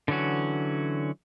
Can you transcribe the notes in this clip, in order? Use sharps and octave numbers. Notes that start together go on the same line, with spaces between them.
D3 E3 F#3 C#4 F#4